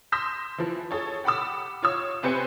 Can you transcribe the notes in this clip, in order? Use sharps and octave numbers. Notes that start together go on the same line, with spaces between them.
C6 D#6 E6 G6 A#6 B6
E3 F3
G#4 A4 C#5
G4 F#5 B5 D6 E6
F4 C#5 E6
C3 C4 B4 C5 G#5 C#7